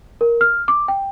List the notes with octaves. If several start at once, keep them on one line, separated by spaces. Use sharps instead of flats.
A#4
F6
D6
G5